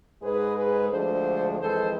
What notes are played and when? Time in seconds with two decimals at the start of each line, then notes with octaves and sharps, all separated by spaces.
0.22 G#2 G#3 G#4 B4
0.56 G#4 B4
0.90 D2 D3 F3 G#3 A4 C5
1.59 F2 E3 G#3 A4 C5